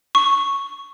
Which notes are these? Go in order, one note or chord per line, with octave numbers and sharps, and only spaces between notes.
C#6